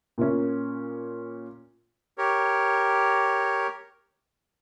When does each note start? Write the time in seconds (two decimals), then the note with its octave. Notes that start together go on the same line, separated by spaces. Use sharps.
0.18 A#2 A#3 C#4
2.18 G4 A#4 C#5